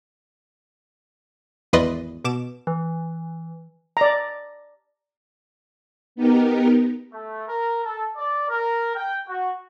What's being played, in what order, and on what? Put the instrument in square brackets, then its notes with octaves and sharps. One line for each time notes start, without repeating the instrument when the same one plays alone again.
[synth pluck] G#1 E2 B4 D5 D#5 C6
B2 D6 E7
[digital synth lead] E3
[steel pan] D5 A#5
[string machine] B3 D#4 G4 A#4
[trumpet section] A3
A#4
A4
D5
A#4
G5
F#4